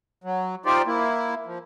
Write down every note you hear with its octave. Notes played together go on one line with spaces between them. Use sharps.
F#3
D#4 F4 G4 C5 D5
A#3 E4
F3